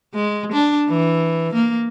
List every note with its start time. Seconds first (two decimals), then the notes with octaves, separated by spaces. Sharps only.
0.15 G#3
0.53 D4
0.89 E3
1.54 A#3